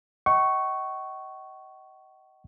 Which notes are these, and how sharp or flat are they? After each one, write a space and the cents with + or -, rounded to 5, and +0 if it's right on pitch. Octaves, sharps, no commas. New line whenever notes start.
D#5 +15 F#5 +45 C#6 +0